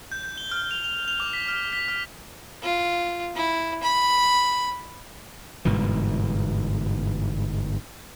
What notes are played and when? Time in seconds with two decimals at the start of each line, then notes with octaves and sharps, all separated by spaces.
0.12 G6
0.24 G6
0.38 G7
0.52 F6
0.71 F7
0.84 F7
1.08 F7
1.20 D6
1.33 B6
1.48 F6
1.73 B6
1.88 F6
2.63 F4
3.36 E4
3.83 B5
5.65 G1 G#2 B2 E3